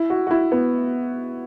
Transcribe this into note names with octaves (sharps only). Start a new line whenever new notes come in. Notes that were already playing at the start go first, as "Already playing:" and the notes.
Already playing: E4
F#4
F#4
E4
B3